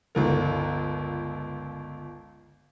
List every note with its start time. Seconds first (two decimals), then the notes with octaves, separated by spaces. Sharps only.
0.15 G1 C#2 A#4